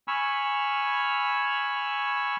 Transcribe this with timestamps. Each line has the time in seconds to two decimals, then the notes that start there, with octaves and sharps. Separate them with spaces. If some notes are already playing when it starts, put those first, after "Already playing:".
0.08 G#5 B5 C#6 E6 F6